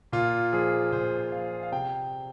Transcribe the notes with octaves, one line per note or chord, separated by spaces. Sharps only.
A#2 F4
F3 G#4
A#2 C5
F3 F5
F5
C3 G5